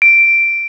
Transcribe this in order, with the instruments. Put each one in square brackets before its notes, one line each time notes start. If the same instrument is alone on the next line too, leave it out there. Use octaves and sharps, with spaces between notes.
[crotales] D7